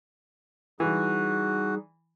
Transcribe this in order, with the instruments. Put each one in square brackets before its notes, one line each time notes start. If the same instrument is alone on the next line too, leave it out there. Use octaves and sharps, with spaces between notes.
[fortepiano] E3 [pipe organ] G3 D#4 G#4 [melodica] F#4